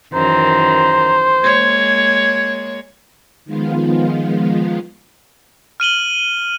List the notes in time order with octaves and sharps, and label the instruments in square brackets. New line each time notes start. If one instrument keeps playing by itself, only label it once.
[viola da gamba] F#2 D#3 E3 [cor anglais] C5 [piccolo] A#5
[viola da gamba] G#3 A#3 C#5 [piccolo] G#6
[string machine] D#3 F3 G#3 B3 F4
[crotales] F6 D#7 F#7 G7